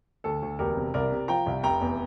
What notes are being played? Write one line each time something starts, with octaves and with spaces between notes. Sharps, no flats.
D2 A4
D2
E1 G4 A#4
C3
C2 A#4 D5
C3
F3 G5 A#5
C2
F1 G5 A#5
E2